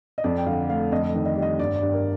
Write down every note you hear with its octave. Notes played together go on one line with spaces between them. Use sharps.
D#5
F2 D5
G5
D3 F5
A3 F5
F2 D#5
D#3
D#5
G3 D5
D#5
G1 D5
D5
G2
A#4